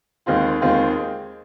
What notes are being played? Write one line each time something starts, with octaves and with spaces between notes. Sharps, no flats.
D#2 D#3 G#3 C4 F4
D#2 D#3 G#3 C4 F4